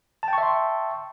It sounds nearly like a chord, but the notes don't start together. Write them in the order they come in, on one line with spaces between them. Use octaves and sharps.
A5 G5 C#6 E5 C6